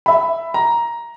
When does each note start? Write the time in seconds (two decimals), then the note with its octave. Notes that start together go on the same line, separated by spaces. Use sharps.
0.06 E5 B5
0.54 A#5